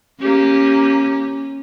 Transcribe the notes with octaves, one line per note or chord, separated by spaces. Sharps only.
A#3 C#4 G4